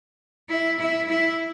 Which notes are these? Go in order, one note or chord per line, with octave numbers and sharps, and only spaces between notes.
E4
E4
E4